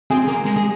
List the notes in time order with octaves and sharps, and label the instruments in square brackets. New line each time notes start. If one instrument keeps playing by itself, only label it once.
[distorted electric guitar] C4 [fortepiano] G#4
[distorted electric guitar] A#3
G#3
G#4